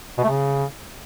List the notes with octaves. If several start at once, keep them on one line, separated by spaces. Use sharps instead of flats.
B2
A3
C#3